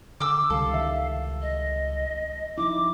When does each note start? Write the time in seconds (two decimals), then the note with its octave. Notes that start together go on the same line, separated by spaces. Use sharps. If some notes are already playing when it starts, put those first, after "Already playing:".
0.20 D3 D6 E6
0.50 C#2 C3 G3 A4 F5
0.70 D#3 E5
1.42 D#5
2.58 F3 D#4 E4 D6